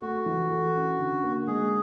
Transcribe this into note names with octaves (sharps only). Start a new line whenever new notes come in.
A3 F#4
E3
A4
C#4
D3
A#3
G#3 G#4